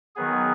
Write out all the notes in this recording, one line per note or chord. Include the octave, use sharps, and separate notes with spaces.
D#3 F#3 B3 G#4